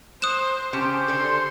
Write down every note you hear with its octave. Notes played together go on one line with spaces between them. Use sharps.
C5 D#6 F#6 E7
C#3 C#4 G4 C5 A5
D3 A4 C6